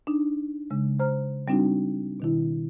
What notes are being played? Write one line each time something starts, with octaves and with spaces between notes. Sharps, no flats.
D4 D#4
C#3 G#3
C5 A#5 F6
G3 C4 D4 D#4 F#4
B2 D#3 E4